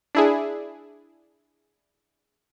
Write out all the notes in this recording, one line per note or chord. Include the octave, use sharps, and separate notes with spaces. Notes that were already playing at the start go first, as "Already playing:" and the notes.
D4 E4 G#4